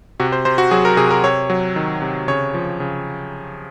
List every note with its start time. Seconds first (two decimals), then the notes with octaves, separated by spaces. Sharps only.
0.20 C3 F#4
0.32 C5
0.45 C3 C5
0.58 F#4
0.71 F#3 G#4
0.85 A#4
0.97 C3 G#4
1.11 A#4
1.24 C3 C#5
1.50 F#3
1.76 D#3
2.02 C3
2.28 C#3 C#5
2.54 F3
2.80 C#3